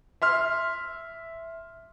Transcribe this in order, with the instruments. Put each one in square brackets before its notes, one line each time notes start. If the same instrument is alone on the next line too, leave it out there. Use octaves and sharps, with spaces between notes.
[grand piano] E5 C6 F6